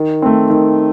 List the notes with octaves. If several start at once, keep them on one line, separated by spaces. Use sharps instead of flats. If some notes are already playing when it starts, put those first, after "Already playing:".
Already playing: D#3
A3 C4
D#3